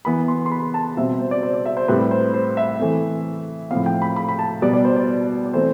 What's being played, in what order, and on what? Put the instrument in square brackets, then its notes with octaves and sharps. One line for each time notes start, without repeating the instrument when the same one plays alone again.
[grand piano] E3 B3 B5
C6
C6
B5
A5
B2 G3 C4 E5
C5
D5
C5
D5
E5
C5
A2 G3 C4 B4
C5
C5
E5
E3 A3 C4
A2 F3 C4 F5
G5
B5
B5
B5
A5
B2 G3 B3 D5
D5
C5
D5
D5
E3 A3 C4 C5